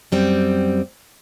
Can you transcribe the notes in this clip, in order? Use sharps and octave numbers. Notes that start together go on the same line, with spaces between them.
F#2 G3 C4